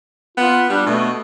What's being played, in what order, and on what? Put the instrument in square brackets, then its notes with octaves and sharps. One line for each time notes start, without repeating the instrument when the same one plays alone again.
[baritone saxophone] B3 [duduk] F4
[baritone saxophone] G3 [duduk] D4
[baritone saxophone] B2 [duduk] A3